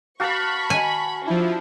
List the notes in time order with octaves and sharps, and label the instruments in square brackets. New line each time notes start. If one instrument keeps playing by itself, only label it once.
[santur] F#4 F5 A5 [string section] B5 C#6
[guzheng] G#5
[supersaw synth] F3 E4 [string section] D4